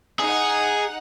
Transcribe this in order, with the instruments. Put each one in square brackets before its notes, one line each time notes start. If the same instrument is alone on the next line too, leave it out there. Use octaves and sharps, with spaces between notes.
[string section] D#4 F#5 [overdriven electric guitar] G#4